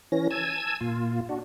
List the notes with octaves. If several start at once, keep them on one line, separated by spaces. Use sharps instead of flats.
E3 C#4 A#6
G#5 A5 E6 G#6
A#2 F4
D4 F#4